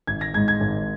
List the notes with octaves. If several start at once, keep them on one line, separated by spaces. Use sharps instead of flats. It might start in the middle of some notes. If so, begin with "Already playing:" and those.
G#1 G#6
A#6
G#2 G#3 G#6
G#6
G#1